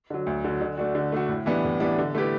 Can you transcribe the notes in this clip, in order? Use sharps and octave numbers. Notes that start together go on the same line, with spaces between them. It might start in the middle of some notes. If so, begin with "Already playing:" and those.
D3 F#3
D2
D3 F#3
D3
A3 D4 F#4
D3
A3 D4 F#4
A2
E3 G3 B3 D4
A2
E3 G3 B3 D4
D3
A3 E4 G4 B4